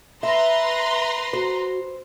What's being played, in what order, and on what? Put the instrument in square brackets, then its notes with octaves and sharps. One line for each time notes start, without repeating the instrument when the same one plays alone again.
[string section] B4 A#5 C6 [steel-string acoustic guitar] E5
[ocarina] F#4 [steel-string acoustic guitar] C5